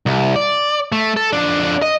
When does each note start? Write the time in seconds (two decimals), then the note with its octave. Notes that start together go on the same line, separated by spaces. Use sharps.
0.06 C2
0.36 D5
0.92 A3
1.17 A4
1.33 F2 D4
1.82 D#5